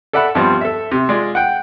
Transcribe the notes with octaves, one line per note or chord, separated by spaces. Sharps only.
A4 D5 E5 F#5 B5
G2 F3 G3 B3 C4
A4 E5
C3
G#3 F4 D5
F#5 G5